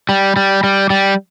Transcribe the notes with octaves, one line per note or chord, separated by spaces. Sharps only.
G3
G3
G3
G3